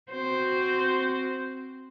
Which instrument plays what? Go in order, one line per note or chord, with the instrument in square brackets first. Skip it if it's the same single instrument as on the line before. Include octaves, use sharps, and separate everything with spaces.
[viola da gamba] C4 F#4 C5